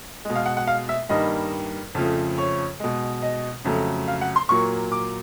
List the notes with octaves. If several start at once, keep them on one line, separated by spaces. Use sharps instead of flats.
B2 G#3
F5
F#5
F#5
F5
E5
G2 D#3 G3 A#3 D#5
F2 C#3 F3 A3
C#5
B2 G#3
D#5
F2 C#3 F#3 A3
F5
F#5
C6
A#2 F#3 A#3 C#6
D6